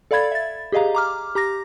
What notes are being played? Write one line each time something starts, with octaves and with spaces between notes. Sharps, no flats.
A4 D5 F5 B5 G#6 A6
E5 A6
G4 G#4 D#5 F5 A#5
A#5 D6 F6
G4 A#5 D6 A#6